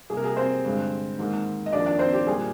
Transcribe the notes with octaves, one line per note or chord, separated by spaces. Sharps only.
C3 G3 A#3 G#4
A#4
G#4
C4 C5
G2 D3 G#3
G#2 D#3 A#3
D#5
F2 D#3 A#3 D4 D5
D4 D5
C4 C5
G4
A#2 G3 A#3 G#4